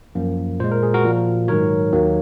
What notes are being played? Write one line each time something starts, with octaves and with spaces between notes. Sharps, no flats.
F#2 F3 A#3
A#2 G#3 C5
A#4
G#4
F#4 A#4
A#2 F3 A#3
G#2 D#3 F#3 A#4 C#5
D#2 D#3 F#3 A#3